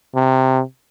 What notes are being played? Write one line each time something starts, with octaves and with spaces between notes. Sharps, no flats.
C3